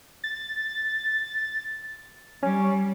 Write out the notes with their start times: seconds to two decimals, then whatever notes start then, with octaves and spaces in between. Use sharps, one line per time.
0.24 A6
2.43 G3 C#4